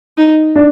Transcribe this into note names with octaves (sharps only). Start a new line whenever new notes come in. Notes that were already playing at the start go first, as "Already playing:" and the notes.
D#4
D4